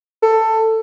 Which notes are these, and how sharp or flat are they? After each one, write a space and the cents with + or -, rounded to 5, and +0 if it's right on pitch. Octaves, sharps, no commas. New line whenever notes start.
A4 +15